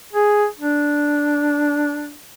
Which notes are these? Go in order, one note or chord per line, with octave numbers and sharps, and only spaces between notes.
G#4
D4